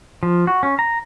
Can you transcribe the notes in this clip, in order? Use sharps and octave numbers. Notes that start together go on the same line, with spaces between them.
F3
F#4
C#4
A#5